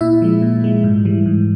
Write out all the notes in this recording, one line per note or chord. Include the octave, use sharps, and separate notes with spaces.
A#2 E4 E5
F3 G#3
A#2
F3 G#3
G#2
E3 G3
G#2